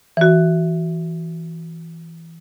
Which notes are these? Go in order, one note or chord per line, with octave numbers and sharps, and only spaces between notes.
E3 F#4